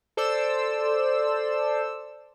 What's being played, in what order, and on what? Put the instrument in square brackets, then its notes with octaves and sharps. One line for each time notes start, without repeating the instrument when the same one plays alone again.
[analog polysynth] A4 C5 D5 E6